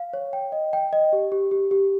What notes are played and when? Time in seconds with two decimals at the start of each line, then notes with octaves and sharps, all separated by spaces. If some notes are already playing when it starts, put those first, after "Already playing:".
Already playing: F5
0.13 C#5
0.33 G5
0.52 D#5
0.73 G5
0.93 D#5
1.13 G4
1.32 G4
1.51 G4
1.71 G4